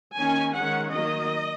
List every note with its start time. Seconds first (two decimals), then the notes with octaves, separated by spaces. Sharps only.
0.16 D#3 A#3 C#4 G#5
0.54 D#3 G#3 C#4 F#5
0.93 D#3 F#3 A#3 D#5